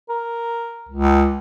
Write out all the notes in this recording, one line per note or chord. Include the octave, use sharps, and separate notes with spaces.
A#4
C#2